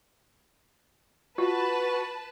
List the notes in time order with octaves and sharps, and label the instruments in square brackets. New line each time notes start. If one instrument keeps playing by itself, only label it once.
[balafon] F4 [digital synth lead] F#4 [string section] B4 A5